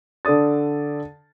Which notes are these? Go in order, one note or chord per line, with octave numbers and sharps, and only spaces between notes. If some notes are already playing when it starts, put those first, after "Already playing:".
D3 A4 D5 D#6 A6